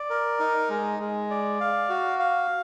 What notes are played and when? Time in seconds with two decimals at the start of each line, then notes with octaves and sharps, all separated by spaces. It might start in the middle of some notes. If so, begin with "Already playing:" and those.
Already playing: D5
0.10 A#4
0.39 D#4
0.69 G#3
0.99 G#3
1.30 D5
1.60 F5
1.89 F#4
2.19 F5